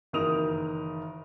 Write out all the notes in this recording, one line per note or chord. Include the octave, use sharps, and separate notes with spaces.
F#1 D#3 E3 A#4 D#6 F7